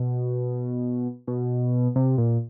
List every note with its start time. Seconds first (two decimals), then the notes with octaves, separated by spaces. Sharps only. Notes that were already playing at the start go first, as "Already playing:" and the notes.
Already playing: B2
1.28 B2
1.96 C3
2.18 A#2